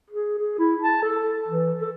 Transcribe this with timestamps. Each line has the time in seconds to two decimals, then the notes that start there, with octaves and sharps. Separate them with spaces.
0.11 G#4
0.39 G#4
0.59 E4
0.81 A5
1.02 A4
1.48 E3
1.81 A4